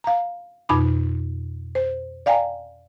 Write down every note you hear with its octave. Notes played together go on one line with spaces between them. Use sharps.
F5 A#5
F2 B2 D#4 B5 D6
C5
D5 F5 G5 G#5 A#5